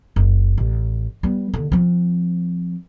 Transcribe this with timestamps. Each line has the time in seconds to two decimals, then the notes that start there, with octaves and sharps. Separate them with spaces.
0.16 F#1
0.58 A1
1.23 G3 B3
1.54 D#2 D3
1.72 F3 C4